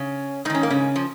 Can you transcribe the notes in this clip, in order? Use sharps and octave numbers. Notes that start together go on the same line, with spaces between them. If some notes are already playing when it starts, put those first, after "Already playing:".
Already playing: C#3 C#4
G#2 D#3 C#4 D#4
A#3
C#3 C#4
F3